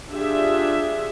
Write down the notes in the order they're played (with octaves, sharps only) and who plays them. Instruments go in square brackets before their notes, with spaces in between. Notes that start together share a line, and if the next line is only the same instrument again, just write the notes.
[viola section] D4 F4 G4 G#4 E5